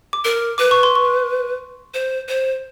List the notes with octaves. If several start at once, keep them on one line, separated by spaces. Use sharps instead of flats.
D6
A#4
B4 D6
C#6
C6
C#6
C5
C5